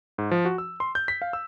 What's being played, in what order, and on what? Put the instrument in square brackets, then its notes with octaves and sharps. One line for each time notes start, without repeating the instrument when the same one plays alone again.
[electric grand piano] G#2
F3
F#4
E6
C6
G6
B6
F5
E6